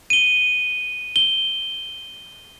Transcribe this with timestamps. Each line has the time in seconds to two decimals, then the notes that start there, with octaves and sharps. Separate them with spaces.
0.10 D#7 G7
1.16 G7